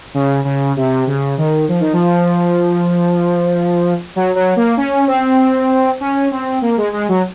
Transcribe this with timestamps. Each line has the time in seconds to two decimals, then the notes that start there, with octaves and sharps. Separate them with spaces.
0.14 C#3
0.45 C#3
0.77 C3
1.07 C#3
1.38 D#3
1.68 F3
1.81 D#3
1.93 F3
4.16 F#3
4.36 F#3
4.56 A#3
4.77 C#4
5.07 C4
6.01 C#4
6.31 C4
6.62 A#3
6.77 G#3
6.93 G#3
7.09 F#3